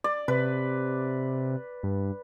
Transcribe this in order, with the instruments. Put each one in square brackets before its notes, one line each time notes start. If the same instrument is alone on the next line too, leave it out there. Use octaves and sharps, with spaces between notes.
[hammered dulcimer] D5
[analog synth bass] C3 [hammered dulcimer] B4
[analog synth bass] G2